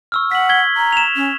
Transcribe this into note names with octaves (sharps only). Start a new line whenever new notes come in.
C#6 E6 F6
F#5 B6 F#7
G#6 B6 G7
A#5
E7 F7
C#4